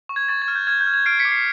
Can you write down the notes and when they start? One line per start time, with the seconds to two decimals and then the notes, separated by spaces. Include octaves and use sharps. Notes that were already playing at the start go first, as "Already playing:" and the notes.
0.09 C#6
0.16 G#6
0.28 C#6 A6
0.42 G#6
0.48 F6
0.55 G6
0.67 F6 G#6
0.81 G6
0.87 F6
0.94 G#6
1.06 F6 C7 D7
1.20 B6 C#7
1.25 D6
1.32 C7